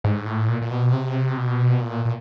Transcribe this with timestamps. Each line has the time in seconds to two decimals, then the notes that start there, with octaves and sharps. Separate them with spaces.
0.04 G#2
0.25 A2
0.49 A#2
0.62 A#2
0.71 B2
0.93 C3
1.37 B2
1.81 A#2
2.05 A#2